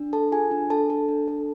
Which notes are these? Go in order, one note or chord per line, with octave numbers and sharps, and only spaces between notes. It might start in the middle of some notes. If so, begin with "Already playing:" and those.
Already playing: D4
A4 A5
F4 G#4 G#5
D4
D4 A4 A5
A4
D4
A4